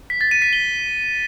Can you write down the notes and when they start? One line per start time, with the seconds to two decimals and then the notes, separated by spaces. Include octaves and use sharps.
0.10 B6
0.21 A6
0.31 D#7
0.42 B6
0.53 G7